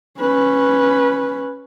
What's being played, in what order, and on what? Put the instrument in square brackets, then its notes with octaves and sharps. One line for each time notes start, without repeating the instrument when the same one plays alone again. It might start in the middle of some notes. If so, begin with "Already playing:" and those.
[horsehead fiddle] C#4 B4